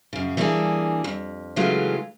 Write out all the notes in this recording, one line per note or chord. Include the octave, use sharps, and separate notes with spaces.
F#2 C#3
E3 G3 A#3 B3 D4 G#4
F2
C#3 E3 F#3 G#3 A3 F4